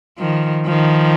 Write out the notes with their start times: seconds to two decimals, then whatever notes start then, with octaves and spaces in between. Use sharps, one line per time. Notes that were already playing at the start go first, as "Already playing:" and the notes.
0.19 D#3 F3
0.66 D#3 F3